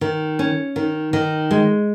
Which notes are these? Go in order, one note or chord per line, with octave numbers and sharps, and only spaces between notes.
D#3
C#4
D#3
D#3
G#3